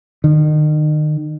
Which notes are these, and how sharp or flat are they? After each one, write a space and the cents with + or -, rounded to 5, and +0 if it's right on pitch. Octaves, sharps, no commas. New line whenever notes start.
D#3 -35